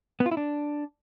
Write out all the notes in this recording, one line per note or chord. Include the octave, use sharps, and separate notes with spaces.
B3
F4
E4
D4